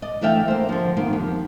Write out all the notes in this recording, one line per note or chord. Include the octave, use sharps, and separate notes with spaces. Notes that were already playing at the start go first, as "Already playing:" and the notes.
D5 D#5
D3 E3 A3 E5 F5 G5
A#3 C5
D3 F3
D#3 A#3 B3 G4
F2